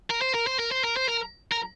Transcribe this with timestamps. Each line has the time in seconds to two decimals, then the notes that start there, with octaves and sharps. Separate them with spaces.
0.10 A#4
0.21 C5
0.34 A#4
0.47 C5
0.59 A#4
0.71 C5
0.84 A#4
0.96 C5
1.08 A#4
1.52 A#4